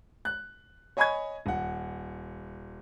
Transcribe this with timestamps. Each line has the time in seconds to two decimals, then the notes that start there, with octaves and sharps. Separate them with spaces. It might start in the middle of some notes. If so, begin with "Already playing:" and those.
0.25 F#6
0.97 C#5 D#5 G#5 B5 C#6 G#6
1.46 D#1 F#5